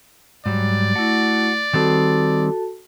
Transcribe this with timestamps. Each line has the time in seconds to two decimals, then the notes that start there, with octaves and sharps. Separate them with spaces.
0.46 G#2 F#3 G3 D5
0.96 A3 E4 F#4
1.73 D#3 G3 C4 F#4 A4 A5